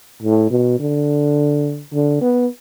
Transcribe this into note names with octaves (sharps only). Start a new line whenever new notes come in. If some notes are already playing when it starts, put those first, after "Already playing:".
A2
B2
D3
D3
B3